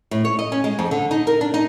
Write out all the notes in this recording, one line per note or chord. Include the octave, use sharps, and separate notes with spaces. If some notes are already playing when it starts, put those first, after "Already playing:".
A2
C#5
D#5
C#4
G#3
F2
D3
D#4
A#4
D4
D#4